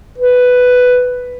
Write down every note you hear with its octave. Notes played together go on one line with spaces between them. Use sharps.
B4